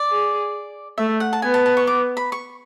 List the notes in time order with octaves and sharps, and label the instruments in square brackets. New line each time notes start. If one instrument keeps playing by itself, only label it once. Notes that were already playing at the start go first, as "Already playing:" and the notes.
Already playing: [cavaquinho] D5
[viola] G#4
[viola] A3 [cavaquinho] E5
[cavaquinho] F#5
A5
[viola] B3 [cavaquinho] G#5
[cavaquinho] A5
A5
C#6
D6
B5
C#6